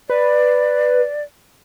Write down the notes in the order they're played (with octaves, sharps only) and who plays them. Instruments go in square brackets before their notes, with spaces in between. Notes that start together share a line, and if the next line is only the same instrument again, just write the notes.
[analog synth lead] B4 [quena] D5